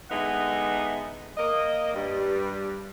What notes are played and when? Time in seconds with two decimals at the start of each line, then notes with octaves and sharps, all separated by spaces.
0.10 D3 G#3 B3 D#4 E5 F#5
1.37 A#3 D#5
1.94 G2 G3